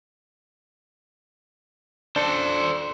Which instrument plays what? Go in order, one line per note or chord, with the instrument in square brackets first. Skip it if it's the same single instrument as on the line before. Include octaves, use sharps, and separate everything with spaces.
[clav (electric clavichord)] D4 [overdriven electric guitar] A4 C5